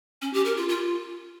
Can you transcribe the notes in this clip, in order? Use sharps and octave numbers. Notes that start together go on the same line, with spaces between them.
C#4
G4
A#4
F4
F4